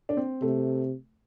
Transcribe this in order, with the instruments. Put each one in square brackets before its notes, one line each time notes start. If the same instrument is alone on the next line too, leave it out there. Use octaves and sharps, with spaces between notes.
[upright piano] D4
C4
[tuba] C3 [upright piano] A3